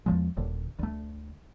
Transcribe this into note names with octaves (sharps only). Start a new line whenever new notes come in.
E2 F3 G#3
D#1 D#2 D3
D2 A3